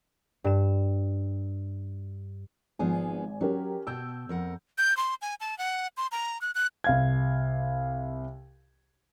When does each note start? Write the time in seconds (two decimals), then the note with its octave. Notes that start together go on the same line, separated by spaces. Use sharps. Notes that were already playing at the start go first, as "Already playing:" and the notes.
0.44 G2 E7
2.79 G#1 F3 B3 G#4 G#5
3.41 F#3 C#4 G4 A#4
3.87 B2 G5 A5 E6 G6
4.29 F2 A#4 F#5
4.78 G6
4.97 C6
5.22 G#5
5.40 A5
5.58 F#5
5.97 C6
6.12 A#5
6.41 F#6
6.55 F#6
6.84 C2 F5 G#6